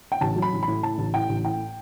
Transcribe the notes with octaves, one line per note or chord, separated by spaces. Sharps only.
G5
A1 A5
F#3
B5
A1
B5
A2
A2 A5
A1
A2 G5
A1
A2 G5